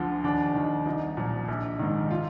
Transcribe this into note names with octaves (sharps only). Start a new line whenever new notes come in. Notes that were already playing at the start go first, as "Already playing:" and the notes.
Already playing: D2 D3 F3
D#2 D4
D#3
C2 D#4
A#2 F3
A#1
G#2 D#3
F4